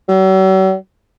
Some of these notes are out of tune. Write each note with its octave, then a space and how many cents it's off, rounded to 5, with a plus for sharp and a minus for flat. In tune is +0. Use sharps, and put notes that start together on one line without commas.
F#3 +45